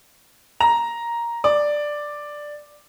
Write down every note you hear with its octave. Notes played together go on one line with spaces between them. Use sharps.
A#5
D5